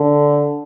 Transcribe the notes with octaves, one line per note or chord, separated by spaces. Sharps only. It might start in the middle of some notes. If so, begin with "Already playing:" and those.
Already playing: D3